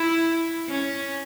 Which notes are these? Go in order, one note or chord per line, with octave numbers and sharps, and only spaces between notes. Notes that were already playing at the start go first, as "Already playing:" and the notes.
Already playing: E4
C#4